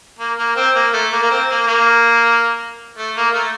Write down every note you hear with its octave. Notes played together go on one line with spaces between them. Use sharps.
A#3
A#3
C4
A#3
A3
A#3
A#3
C4
A#3
A#3
A3
A#3
A3